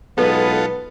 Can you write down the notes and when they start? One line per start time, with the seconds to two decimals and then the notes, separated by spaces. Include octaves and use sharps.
0.18 B1 G#3 B3 F4 A4 B4